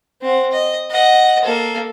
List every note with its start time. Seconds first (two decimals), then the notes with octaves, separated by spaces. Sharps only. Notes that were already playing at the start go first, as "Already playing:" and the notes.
0.21 C4 F#5
0.51 D#5
0.90 D#5 F#5
1.44 A#3 A4